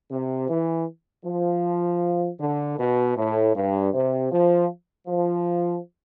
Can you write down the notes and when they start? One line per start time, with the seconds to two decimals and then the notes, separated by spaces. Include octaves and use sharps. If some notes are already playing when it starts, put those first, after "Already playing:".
0.10 C3
0.48 E3
1.24 F3
2.39 D3
2.78 B2
3.16 A2
3.54 G2
3.93 C3
4.31 F3
5.07 F3